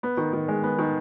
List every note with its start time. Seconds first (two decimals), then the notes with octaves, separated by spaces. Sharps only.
0.03 B3
0.17 D#3
0.33 D#3
0.48 G#3
0.63 B3
0.79 D#3